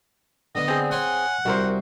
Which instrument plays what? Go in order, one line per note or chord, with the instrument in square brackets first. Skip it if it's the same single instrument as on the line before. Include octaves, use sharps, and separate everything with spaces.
[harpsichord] D3 B3 [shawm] D#5
[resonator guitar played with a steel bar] C4 G#4
[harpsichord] C#5 G#5 C6 [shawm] F#5
[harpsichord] C2 [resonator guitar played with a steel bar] F#4 A#4 C5